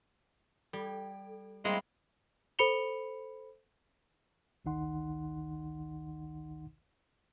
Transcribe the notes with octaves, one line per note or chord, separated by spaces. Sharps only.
G3 A4
G3 G#3 A#3 C4 E4 G5 C6
A4 C5 B5 C#7 F7 G7
A1 D2 D#3 D#4 F#5 C6